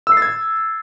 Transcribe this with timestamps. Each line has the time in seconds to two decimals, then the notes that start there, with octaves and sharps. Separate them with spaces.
0.07 E6
0.12 C7
0.17 A6
0.22 G#6